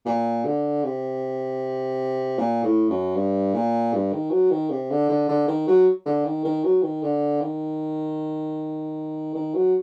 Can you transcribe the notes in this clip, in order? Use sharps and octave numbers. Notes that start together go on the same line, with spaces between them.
A#2
D3
C3
A#2
A2
F#2
G2
A#2
G2
D#3
F#3
D#3
C3
D3
D3
D3
D#3
F#3
D3
D#3
D#3
F#3
D#3
D3
D#3
D#3
F#3